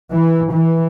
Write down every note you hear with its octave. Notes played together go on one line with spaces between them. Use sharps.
E3
E3